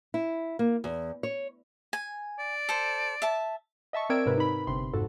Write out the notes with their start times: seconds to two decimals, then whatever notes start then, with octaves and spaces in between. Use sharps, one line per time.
0.14 E4
0.59 A#3
0.84 E2
1.23 C#5
1.93 G#5
2.40 D5
2.69 A4 C5
3.22 E5 A5
3.93 D#5 E5 A5 C#6
4.10 C4 A#4 D5 E6 G#6 D7
4.26 G#2 C3 A#4 B4
4.38 D#4 B5
4.67 G1 C3 C6
4.93 F2 G#2 F#4 A4